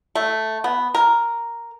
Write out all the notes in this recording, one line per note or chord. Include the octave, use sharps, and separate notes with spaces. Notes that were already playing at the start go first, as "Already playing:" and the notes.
A3
B3
A#4